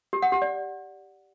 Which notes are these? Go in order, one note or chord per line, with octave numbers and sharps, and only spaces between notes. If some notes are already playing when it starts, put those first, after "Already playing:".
G4
F#5
G4
D5